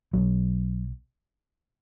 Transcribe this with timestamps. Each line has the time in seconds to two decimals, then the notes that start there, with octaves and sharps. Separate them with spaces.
0.13 B1 B2 F#3